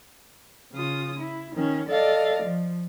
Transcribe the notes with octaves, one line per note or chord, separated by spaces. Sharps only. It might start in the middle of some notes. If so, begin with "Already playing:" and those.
C#3 F4 D#6
E4
D#3 C#4
A4 D5 D#5 F5
F3